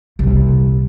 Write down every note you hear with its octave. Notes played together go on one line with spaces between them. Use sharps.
C2 A#2